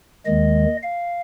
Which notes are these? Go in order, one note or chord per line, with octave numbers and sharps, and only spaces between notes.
D#2 D#3 G#3 D#5
F5